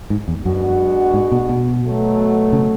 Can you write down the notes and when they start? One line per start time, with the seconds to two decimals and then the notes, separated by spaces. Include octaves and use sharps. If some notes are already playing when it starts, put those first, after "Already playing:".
0.10 G#2
0.28 E2
0.45 F#2 G#3 B3 D4 F#4
1.14 G#2
1.32 B2
1.49 B2
1.84 B2 F#3 A3
2.53 C#3